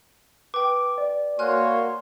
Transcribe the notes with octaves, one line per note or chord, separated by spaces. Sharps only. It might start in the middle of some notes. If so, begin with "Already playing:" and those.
B4 G5 D6
D5
A#3 F#4 C#5 G#5 C6 F6 F#6